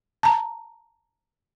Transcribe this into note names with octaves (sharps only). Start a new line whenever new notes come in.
A5 A#5